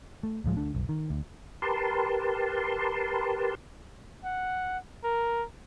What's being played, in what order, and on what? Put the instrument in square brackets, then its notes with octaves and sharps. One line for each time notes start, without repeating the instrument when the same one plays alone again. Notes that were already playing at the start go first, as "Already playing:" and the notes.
[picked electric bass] A3
D1 A2 F3 G#3
D2 A3 D4
F1 B1
D#3
D2
[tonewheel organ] G4 A#4 B4 A5 C6
[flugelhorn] F#5
A#4